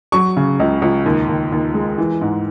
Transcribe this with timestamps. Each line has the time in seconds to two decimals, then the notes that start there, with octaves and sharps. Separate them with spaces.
0.12 F#3 C#6
0.37 C#3
0.60 C#2
0.82 C#2
1.06 D#2
1.28 D#2
1.52 D#2
1.74 G#3
1.98 E3
2.21 G#2